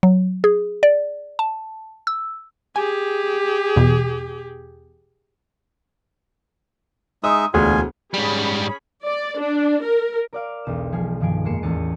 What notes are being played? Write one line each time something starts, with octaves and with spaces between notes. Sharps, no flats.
F#3
G#4
D5
A5
E6
G4 G#4 G#5
E2 B2
G#3 D#4 E5 D#6
E1 D2 F4 G#4 G#5
G#2 G3 C#4 G#4 B5
D5
D4
A#4
A#4 D5 F5
E1 B1 E7
F3 G3 G#4
G2 D#3 F3 G#4 D7
F2 G#3 A#3 C7 C#7 E7
A1 E2 A6 C#7 D#7